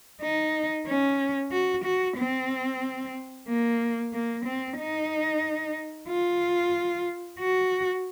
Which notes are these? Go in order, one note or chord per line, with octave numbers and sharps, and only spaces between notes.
D#4
C#4
F#4
F#4
C4
A#3
A#3
C4
D#4
F4
F#4